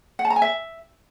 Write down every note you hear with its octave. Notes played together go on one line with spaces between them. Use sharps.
F#5
A5
A#5
G#5
E5